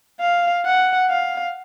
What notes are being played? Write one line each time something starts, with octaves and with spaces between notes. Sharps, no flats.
F5
F#5
F5